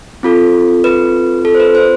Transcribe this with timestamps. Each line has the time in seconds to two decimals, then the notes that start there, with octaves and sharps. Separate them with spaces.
0.23 C4 F4 A4
0.84 B4
1.45 A4
1.55 C5
1.60 B4
1.75 C5